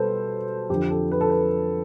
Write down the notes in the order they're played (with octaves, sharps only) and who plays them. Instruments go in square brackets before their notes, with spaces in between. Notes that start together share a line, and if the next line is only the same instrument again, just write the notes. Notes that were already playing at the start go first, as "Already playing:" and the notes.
Already playing: [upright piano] B2 G3 A4 B4 C5
F2 D3 F3 G4
A4
B4
A4
B4